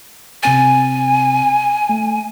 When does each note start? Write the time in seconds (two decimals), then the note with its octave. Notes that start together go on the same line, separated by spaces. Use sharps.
0.43 C3 C4 G#5 A6
1.89 A3